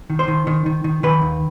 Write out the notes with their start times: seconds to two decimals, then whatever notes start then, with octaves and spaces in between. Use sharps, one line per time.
0.10 D#3
0.19 C5
0.28 D#3
0.47 D#3
0.66 D#3
0.84 D#3
1.03 D#3 B4
1.22 D#2